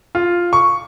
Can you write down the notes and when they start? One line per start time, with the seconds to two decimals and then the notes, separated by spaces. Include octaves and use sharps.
0.15 F4
0.53 C#6